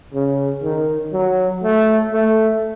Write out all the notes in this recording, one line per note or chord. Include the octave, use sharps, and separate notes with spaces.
C#3
D#3
F#3
A3
A3